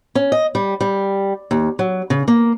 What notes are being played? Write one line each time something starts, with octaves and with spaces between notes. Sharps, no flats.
C#4
D#5
G3
G3
D#2
F#3
C#3
A#3